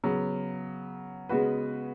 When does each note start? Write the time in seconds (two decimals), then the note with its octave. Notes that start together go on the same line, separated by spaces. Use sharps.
0.04 C#3 F#3 B3
1.29 C#3 G#3 B3 F#4 B4